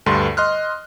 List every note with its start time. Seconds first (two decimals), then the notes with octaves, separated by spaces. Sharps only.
0.06 D2 G2 A4 B4 C6
0.37 D#5 C6 F6 F#6